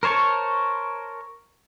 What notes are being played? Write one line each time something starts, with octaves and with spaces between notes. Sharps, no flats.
A#4 C5 C#5 A5 C#6